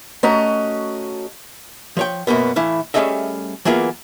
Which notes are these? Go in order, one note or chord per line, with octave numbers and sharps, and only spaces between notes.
A3 C#4 F#4 D#5 A#5
F3 C#5 G5
F#2 B2 A#3 B3
A2 E3 E4 F5
G3 A3 C#4 G#4 D#5 E5
E3 F#3 A#3 B3 F4 G#4